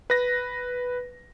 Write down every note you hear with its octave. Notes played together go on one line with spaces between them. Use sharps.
B4 A#6